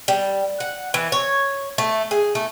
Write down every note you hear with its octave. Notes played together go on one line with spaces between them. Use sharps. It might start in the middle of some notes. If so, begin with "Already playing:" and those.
G3
F#5
E3
C#5
A3
G#4
A3